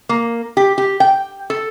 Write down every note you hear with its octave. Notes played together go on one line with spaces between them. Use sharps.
A#3
G4
G4
G5
A4